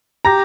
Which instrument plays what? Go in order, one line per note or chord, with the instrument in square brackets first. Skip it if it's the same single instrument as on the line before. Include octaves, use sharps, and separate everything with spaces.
[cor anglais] G4 [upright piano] A#5 A#6